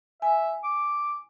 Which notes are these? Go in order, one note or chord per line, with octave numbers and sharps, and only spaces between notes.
E5 G#5
D6